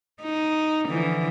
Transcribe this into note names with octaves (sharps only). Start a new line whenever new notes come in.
D#4
D3 E3 F3